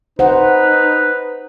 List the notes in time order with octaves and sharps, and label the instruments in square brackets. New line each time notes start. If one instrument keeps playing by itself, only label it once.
[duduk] D#4 [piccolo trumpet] B4 [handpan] C5 F#5